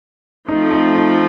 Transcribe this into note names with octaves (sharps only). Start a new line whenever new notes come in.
F3 A3 C4 D#4
D#4
D#4